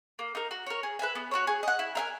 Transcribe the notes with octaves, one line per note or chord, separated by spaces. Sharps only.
A#3
D#4 A#4
F#4
A#4 C#5
G#4
B4 E5 G#5
B3
F#4 A#4 C#5
G#4
D#5 F#5
E4
A#4 E5 G#5